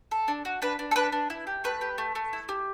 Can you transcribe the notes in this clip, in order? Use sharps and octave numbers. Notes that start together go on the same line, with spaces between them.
A4
D4
F#4
D4 B4
D4
A4
D4 B4
D4
E4
G4
A3 B4
G4
A3
A3
E4
G4